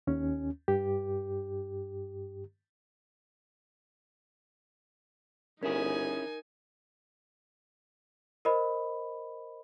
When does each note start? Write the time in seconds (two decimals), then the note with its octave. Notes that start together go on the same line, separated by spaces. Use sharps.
0.07 D#2 C#4
0.68 G2 G4
5.63 G1 C#4 D#4 E4 G#4 A#4 G#5
8.45 A#4 C5 D#5 B5